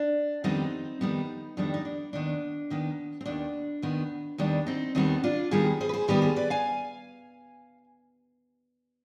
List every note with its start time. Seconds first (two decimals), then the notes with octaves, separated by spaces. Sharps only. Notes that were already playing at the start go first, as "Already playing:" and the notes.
Already playing: D4
0.44 F2 D#3 G3 B3 C4 D#4
1.01 F2 D#3 G3 B3
1.57 F2 D#3 G3 B3 D4
1.74 D#4
1.85 D4
2.13 D#2 D#3 B3 D4
2.70 D#2 D#3 B3
3.21 C4
3.26 D#2 D#3 B3 D4
3.82 D#2 D#3 B3
4.38 D#2 D#3 G3 B3 D4
4.67 C4 D#4
4.95 D#2 D#3 G3 B3 C4 D#4
5.24 D4 F4
5.51 D#2 D#3 G3 B3 F4 G#4
5.81 G#4 C5
5.89 B4
5.93 G#4 C5
6.08 D#2 D#3 G3 B3 G4 B4
6.22 G#4 C5
6.36 B4 D5
6.50 F5 G#5